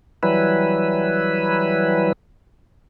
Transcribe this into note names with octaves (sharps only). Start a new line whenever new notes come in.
E3 F#3 G3 E4 B4